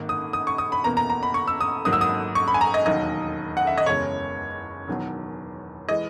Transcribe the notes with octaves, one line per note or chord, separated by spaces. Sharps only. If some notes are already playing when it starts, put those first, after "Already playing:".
Already playing: G#1 G#2 D#3 A#3
D#6
D#6
C#6
D#6
B5
E2 B2 A#3 A#5
A#5
A#5
B5
C#6
E6
D#6
G#1 G#2 F#3 A#3 D#6
E6
D#6
C#6
B5
G#5
A#5
D#5
E1 D#2 D#3 F#3 D#5
F#5
E5
D#5
F#1 E2 C#3 G#3 C#5
E1 E2 D#3 F#3
E3 G#3 D#5